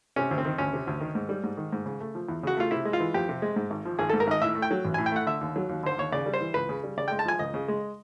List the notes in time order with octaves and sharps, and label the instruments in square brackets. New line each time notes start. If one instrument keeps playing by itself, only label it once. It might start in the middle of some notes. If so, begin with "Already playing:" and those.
[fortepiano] C3 C#4
D2
C4
D#3
D2 C#4
C3
D2
D#3
G#2
G3
G#2
D#3
G#2
C#3
A3
F3
E2
C#3 F#4
A3 F4
C3 E4
G#3
F4
E3
F2 G4
C3
G#3
G#2
G#1
F3
G#1 G#4
G#2 A4
A#4
G#1 D#5
A2 E5
A3
G5
F#3
A1
A2 G#5
G5
A3 F#5
D3 E5
D#2
F#3
D#2
D3 C5
D#2 C#5
C#3 D5
G3
C5
E3
C#2 B4
C#3
G3
C#3 D5
G#3 G5
A5
F3 G#5
C#2 D#5
C#3
G#3